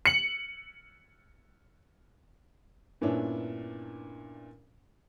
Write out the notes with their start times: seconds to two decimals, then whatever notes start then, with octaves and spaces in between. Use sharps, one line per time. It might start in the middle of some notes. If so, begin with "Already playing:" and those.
0.06 C#7 F#7
3.01 G2 A#2 B3 C#4 D4 E4